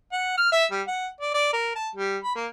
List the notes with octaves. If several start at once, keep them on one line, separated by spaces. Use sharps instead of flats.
F#5
F6
E5
G3
F#5
D5
D5
A#4
A5
G3
B5
A#3